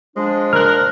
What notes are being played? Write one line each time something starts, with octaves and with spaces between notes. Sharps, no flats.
F3 G#3 D4
A#2 A#4 F6 F#6